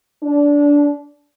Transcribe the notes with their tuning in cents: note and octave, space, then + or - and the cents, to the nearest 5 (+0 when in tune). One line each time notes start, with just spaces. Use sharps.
D4 -20